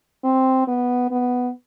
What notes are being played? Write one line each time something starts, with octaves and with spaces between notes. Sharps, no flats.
C4
B3
B3